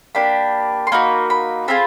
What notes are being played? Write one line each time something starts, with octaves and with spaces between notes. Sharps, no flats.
A#3 D4 G4 B5
C6
A#3 D#4 F#4 B5
B5
C4 F4 G#4 B5